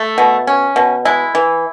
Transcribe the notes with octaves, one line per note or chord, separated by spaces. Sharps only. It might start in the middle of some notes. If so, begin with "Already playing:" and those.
Already playing: A3
B2
C#4
B2
G#3 E4
E3